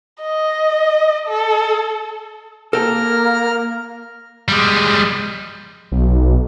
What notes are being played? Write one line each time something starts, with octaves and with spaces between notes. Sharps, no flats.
D#5
A4
A#3 A4 A#4 G5 A5 F6
G3 G#3
B1